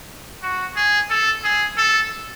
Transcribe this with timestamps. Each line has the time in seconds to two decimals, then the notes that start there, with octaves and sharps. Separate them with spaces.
0.43 F#4
0.76 G#4
1.10 A4
1.44 G#4
1.77 A4